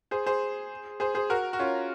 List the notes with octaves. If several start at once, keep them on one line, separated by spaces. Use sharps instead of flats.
G#4 C5
G#4 C5
G#4 C5
G#4 C5
F#4 A#4
F#4
C#4 F4